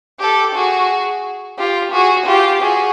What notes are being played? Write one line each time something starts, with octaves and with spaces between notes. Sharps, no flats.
G4 A4
F#4 G#4
F4 G4
F#4 G#4
F4 G4
F#4 G#4